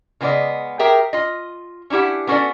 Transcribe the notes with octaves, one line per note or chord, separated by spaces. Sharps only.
C#3 G#3 B3 F#4 D5 D#5
G4 G#4 A#4 E5 G5
F4 D#5
C#4 D4 E4 G4 F#5
B3 C#4 F#4 G#4 A4 D5